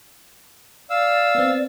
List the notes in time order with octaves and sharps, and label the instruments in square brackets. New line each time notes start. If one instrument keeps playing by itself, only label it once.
[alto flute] D5 [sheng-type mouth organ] F5 E6
[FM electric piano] B3 C4